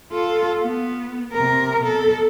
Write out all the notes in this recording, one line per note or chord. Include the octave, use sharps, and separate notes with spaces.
F4 A4
B3
C3 A#4
B2 A4